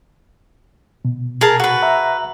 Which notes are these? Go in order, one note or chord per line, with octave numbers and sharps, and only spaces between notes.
B2
G#4 A#4 A5
F#4 B4
E5 A#5